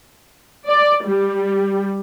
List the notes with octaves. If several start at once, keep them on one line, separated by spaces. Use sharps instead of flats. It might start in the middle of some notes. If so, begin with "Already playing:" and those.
D5
G3